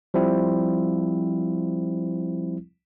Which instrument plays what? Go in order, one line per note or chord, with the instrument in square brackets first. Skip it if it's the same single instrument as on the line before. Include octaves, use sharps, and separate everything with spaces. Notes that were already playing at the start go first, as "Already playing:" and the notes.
[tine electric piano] F3 G3 C4 E4